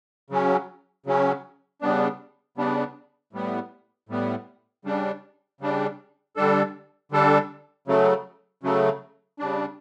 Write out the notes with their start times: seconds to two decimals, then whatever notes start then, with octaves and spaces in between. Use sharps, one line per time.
0.30 C#3 F#3 C#4
1.06 C#3 F#3 C#4
1.81 C#3 G3 B3 D4
2.57 C#3 G3 B3 D4
3.33 A2 G3 B3
4.09 A2 G3 B3
4.85 C#3 G3 D4
5.61 C#3 G3 D4
6.36 D3 G3 D4 A4
7.12 D3 G3 D4 A4
7.88 C#3 F#3 A3
8.63 C#3 F#3 A3
9.39 C#3 G3 D4